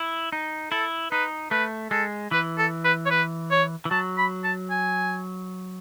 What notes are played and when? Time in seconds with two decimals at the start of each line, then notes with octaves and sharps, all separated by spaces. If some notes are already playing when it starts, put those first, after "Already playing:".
Already playing: E4
0.33 D#4
0.72 E4 A4
1.12 D#4 B4
1.51 A3 B4
1.91 G#3 A4
2.31 E3 B4
2.58 A4
2.85 B4
3.06 C#5
3.11 B4
3.51 C#5
3.85 E3
3.91 F#3 A5
4.18 B5
4.44 A5
4.70 G#5